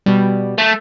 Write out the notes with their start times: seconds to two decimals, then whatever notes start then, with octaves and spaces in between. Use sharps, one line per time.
0.06 B2 G3
0.58 A3